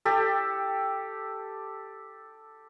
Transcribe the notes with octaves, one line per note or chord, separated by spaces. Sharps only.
G4 A4